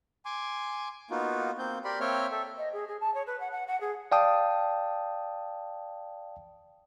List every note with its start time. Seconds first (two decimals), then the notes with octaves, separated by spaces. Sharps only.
0.25 G#5 C6 D6
1.11 A#3 B3 D#4 F4 F#4
1.59 A#3 C4 G6
1.84 G4 A#4 D5 B5 C6
2.00 A#3 C4 C#5 E5 G5 F6
2.31 A4 E5
2.56 D#5
2.72 G#4
2.87 G#4
3.00 A5
3.14 C#5
3.26 B4
3.40 F#5
3.51 F#5
3.67 F#5
3.80 G#4
4.12 D5 F5 G5 A5 D#6